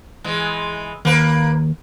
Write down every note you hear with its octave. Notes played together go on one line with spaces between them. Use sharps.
E3 G#3
D#2 A#3 B4